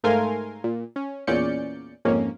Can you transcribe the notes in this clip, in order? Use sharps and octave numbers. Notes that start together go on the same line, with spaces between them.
G#2 A3 A#4 F5 G#5 C6
A#2
C#4
E2 A#2 C#4 D5 G6 C#7
F2 G#2 A#3 C#4